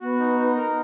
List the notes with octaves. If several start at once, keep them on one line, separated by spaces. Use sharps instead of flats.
B3 F#4
D#4
D#4
A#4